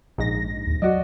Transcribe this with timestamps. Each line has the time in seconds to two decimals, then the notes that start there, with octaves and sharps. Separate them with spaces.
0.18 A#1 G#2 A#6
0.67 D#2
0.82 F#3 F#4 D5 D#5